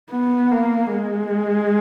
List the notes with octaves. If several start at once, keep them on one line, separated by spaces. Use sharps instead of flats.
B3
A#3
G#3